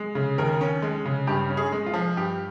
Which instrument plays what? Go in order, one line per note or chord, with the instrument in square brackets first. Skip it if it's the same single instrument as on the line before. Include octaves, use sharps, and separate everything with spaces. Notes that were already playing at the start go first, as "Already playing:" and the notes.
Already playing: [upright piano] G#3
C#3
D#2 A#4
C#4
G#3
C#3
G2 G4
C#4
G#4
G#3
F4
F3
G2 G4